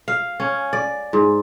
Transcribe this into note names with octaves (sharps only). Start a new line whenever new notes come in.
F5
C#4
D5
G#2